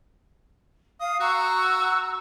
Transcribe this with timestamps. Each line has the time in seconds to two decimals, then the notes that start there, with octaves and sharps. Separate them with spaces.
1.00 F5 D#6
1.20 F#4 A#5 C#6 E6